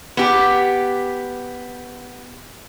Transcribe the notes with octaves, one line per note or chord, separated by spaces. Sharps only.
B3 G4